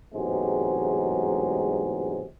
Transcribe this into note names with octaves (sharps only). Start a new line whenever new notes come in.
A1 E2 G#2 C3 F#3 G#3